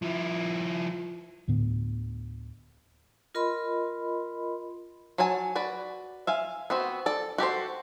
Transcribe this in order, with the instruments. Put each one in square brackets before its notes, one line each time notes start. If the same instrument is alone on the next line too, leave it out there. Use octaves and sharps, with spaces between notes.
[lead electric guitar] F3 E4
[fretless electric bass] D2 A2 D3 B3
[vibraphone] F4 A#4 D#5 B5 C6
[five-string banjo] F#3 F#4 C#5 G#5 A5
F#4 B4 D5
E5 F5 G#5
B3 C4 F#4
A4 D5
F#4 G4 A4 C5